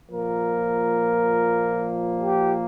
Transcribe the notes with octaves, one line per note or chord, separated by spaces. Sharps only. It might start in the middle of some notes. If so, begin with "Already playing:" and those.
A#2 F3 A#3 A#4
G4